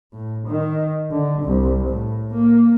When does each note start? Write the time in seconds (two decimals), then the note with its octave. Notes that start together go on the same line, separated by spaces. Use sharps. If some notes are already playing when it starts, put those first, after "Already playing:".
0.12 A2
0.48 D#3
1.11 D3
1.43 C2
1.88 A2
2.34 A#3